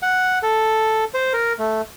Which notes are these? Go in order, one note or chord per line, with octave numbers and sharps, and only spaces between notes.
F#5
A4
C5
A#4
A3